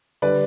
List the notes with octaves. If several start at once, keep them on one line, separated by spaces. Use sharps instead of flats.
D3 G3 B4 D5